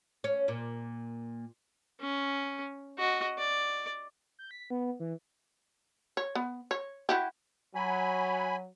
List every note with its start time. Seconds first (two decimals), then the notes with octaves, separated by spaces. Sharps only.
0.24 C#4
0.48 A#2
2.00 C#4
2.98 F#4 D#5
3.38 D5
4.39 G6
4.51 B6
4.70 B3
5.00 E3
6.17 C#5
6.35 B3
6.71 C#5
7.09 E4 F#4 G4
7.75 F#3 G#5 B5